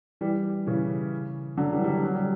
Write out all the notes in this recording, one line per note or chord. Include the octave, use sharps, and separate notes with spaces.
E3 G3
C#3 E3
D3 F#3
E3 G3
G3
D3 F#3
F#3
G3